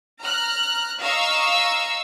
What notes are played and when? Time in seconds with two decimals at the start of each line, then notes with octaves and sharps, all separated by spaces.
0.22 A#5 F6 F#6
1.01 D#5 F5 A#5 C#6 E6